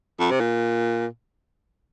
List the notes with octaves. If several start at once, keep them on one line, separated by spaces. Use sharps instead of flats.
F2
C3
A#2